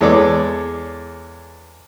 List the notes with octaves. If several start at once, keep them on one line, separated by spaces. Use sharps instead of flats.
E2 G#3 A4 C#5 D5 D6